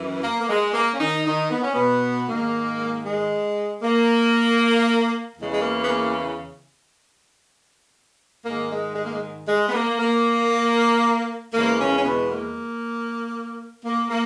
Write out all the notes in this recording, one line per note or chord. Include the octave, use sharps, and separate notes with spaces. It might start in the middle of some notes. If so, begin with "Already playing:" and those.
Already playing: F#2 E3
A#3
A#3
G#3
A#3
C#4
D#3 D#4
D#3 D#4
B3
C#4
B2 B3
G#2 D#3 G#3 A#3
G#3
A#3
E2 C#3 E3 G#3
G#3
A#3
B3
A#3
G#2 D#3 G#3 A#3
G#3
G#3
A#3
G#3
G#3
B3
A#3
A#3
E2 C#3 E3 G#3 A#3
C#3 C#4
C#4
B2 B3
A#3
A#3
A#3